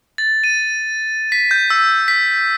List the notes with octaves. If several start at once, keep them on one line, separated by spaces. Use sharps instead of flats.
A6
D#7
B6
G6
E6
B6